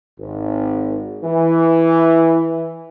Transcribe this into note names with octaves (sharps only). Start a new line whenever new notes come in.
G#1
E3